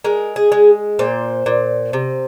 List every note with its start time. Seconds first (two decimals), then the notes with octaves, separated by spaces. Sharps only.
0.05 G#3 A#4
0.36 G#4
0.52 G#3
0.99 A#2 C5
1.46 A#2
1.93 C3